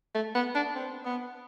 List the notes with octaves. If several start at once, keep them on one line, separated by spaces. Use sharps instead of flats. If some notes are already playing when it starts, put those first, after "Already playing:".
A3
B3
D4
C4
B3